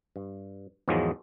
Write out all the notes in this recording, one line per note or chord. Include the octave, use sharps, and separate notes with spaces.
G2
E2 G#2 D#3 F3 F#3 G#3